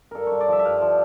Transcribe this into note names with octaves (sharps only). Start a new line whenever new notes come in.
G2 A4 A#4
G2 C#5
D5
F3 E5
E5
G2 F5
F3